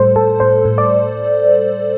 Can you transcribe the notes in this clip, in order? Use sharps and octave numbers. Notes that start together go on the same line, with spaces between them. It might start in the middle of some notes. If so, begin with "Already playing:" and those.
Already playing: A2 G3 A4 C5
A2 A4
A2 C5
A2
D5